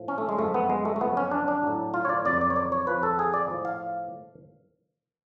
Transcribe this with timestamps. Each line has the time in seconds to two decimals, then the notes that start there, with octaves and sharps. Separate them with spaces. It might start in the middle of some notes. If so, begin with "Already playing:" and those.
Already playing: A2 F3
0.08 C#4
0.18 A3
0.29 G#3
0.38 F#2 F3 A3
0.54 B3
0.70 G#3
0.85 A3
0.96 A3
1.01 F#2 C#3 F3 B3
1.17 C#4
1.31 D4
1.48 D4
1.63 A2 F#3
1.94 F4
2.05 C#5
2.09 D5
2.25 F2 C#3 F#3 D5
2.41 D5
2.50 C#5
2.56 D5
2.72 C#5
2.87 F2 F3 B4
3.03 A4
3.19 G#4
3.34 D5
3.50 A2 F3
3.65 F5